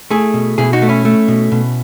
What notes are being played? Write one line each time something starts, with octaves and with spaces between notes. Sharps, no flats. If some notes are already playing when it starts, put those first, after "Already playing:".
A3 E4 G#4
B2
B2 E4 G#4
D#4 F#4
A3
C#4 E4
A3
B2
B2